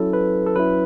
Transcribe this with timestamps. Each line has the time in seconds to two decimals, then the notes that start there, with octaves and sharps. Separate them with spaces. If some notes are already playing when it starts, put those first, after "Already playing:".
Already playing: F#3 C#4 E4 A4
0.13 B4
0.46 A4
0.56 F#3 C#4 E4 B4